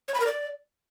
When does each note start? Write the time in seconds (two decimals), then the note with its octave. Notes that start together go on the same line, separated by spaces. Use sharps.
0.08 C#5
0.14 B5
0.20 A#4
0.26 D5